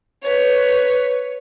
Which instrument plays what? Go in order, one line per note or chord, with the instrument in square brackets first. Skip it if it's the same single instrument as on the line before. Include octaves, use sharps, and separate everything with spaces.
[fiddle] B4 C#5